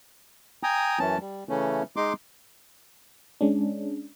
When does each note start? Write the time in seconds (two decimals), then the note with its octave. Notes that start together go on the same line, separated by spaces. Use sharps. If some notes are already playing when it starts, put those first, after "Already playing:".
0.63 G5 G#5 A#5 D#6
0.99 F#2 E3 C#4 A5
1.20 G3
1.49 C#3 E3 A3 C#4
1.96 G#3 D#4 C6 D6
3.41 G#3 C#4 D4